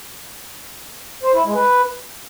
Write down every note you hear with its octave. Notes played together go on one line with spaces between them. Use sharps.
C5
E4
G#3
B4